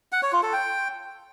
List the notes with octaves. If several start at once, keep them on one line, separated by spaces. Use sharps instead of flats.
F#5
C#5
F4
A4
G5